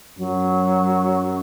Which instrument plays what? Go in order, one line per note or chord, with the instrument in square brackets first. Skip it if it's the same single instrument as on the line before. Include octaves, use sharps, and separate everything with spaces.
[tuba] F#2 [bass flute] F#3